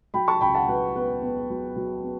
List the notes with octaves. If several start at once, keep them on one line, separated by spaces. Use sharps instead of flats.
F#3 G5 B5
A5 C#6
C#2 G5 B5
F#5 A5
F#3 B4
B3 B4
B3
F#3
F#3
B3